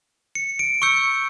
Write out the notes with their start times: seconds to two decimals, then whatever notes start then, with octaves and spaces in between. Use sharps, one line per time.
0.35 C#7
0.59 D7
0.82 C#6 E6 G6 C#7